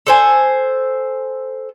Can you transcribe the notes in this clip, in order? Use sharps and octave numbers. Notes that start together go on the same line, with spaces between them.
A4 C5 G#5